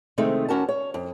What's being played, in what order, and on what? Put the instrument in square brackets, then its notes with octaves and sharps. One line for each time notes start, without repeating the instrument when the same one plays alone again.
[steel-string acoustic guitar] C3 D#3 G#3 A3 C4 D#4
D#2 B2 C#4 F#4 A#4 A5
C#5
F2